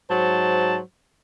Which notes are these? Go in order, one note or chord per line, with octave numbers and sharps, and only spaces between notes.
G#2 F#3 C5 A5